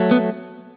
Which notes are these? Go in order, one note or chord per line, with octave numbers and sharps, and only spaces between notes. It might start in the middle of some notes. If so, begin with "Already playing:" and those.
Already playing: F#3 A3
B3